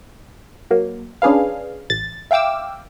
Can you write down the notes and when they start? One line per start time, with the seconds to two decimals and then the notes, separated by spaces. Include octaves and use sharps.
0.71 F#3 A#3
1.22 C#4 D4 G#4 B4 F5
1.90 A1 A6
2.31 E5 F5 G5 D6 E6